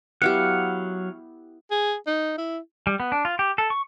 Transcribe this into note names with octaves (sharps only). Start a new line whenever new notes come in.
F#3 B3 E4 G4 F5 F#5
G#4
D#4
E4
G3
B3
D4
F4
G4
A4
C#6